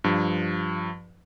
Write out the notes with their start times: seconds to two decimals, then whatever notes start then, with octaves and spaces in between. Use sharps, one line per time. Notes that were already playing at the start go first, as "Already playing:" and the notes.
0.04 G2 F3